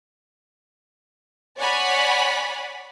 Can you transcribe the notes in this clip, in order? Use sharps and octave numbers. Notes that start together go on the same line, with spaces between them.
C#5 D5 F#5 G#5 B5